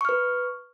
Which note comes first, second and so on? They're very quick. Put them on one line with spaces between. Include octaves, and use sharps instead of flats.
C#6 F6 B4